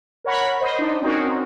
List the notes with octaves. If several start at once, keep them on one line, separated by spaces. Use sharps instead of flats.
A#4 C#5 F#5 B5
C5 D#5
D4 D#4
C4 C#4 D#4 F#4 A#4